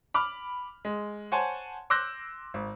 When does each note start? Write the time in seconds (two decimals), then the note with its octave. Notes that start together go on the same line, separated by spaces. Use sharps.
0.14 B5 D6 F6
0.85 G#3
1.32 C5 C#5 F#5 G#5 A5
1.90 C6 D6 E6 F#6 G6 A#6
2.54 G#1